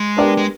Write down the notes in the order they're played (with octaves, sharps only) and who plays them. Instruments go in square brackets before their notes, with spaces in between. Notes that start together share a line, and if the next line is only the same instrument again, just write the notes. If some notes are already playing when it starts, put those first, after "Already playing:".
Already playing: [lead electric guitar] G#3
[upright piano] B3 D4 G4 A#4 D5
[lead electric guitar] G#3